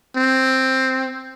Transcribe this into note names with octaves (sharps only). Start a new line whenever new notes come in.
C4